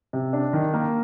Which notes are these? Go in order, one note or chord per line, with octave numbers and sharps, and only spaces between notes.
C3
D4
D#3
A#3